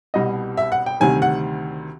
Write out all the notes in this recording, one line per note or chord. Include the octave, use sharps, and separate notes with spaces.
C2 B2 G3 D#5
E5
F#5
G5
D2 C3 D#3 G3 G#5
F#5